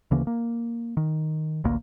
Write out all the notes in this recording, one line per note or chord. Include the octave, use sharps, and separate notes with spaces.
D2 C#3 E3 A#3
A#3
D#3
A1 D2 A#3